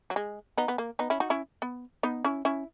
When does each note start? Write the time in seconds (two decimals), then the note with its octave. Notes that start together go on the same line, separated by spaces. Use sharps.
0.10 F#3
0.16 G#3
0.58 B3 D#4
0.68 B3
0.78 A#3
0.99 B3 D#4
1.10 C#4 E4
1.20 D#4 F#4
1.30 C#4 E4
1.62 B3
2.03 B3 D#4
2.25 C#4 E4
2.45 C#4 E4